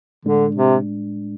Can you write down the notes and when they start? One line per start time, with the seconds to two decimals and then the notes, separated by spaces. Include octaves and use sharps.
0.25 A2 D3 G#3 D4
0.55 C3